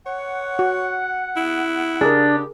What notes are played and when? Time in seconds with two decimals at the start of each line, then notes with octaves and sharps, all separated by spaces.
0.06 C#5 F#5
0.59 F#4
1.36 E4
2.01 C#3 D4 G4 G#4 A#4